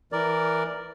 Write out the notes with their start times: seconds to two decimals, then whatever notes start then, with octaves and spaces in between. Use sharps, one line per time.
0.12 E3 A#4 D5